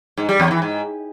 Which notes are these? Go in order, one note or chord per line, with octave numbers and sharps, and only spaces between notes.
G#2
G3
E2
E3
G#2